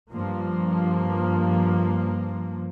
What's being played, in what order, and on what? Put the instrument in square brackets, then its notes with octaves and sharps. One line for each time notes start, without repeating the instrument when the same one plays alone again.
[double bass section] G2 F3 A#3